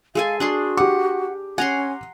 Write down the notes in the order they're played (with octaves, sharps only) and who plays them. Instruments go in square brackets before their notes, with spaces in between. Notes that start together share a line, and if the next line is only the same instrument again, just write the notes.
[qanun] G#3 A4 G#5 [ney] F5
[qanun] D4 G#4 C6 [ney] F#4
[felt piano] G4 D6 [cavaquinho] F#5
[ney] C#4 [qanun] F#5 A#5 C6 [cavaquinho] G#5